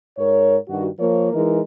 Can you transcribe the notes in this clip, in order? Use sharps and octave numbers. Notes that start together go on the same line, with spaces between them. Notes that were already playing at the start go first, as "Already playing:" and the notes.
G#2 A#4 C#5
G2 D#3 F#4
F3 A#3 A#4 C#5
E3 G#3 D#4 A#4